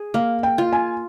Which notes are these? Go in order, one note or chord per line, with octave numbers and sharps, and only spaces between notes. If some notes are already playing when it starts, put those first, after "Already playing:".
Already playing: G#4
A#3 F5
G5
F4
G#5